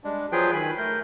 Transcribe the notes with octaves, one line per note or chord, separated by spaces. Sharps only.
G3 G#3 D4
F3 F#3 F4 G#4 B4 G5
D#3 G#5 B5
A3 A#4 G6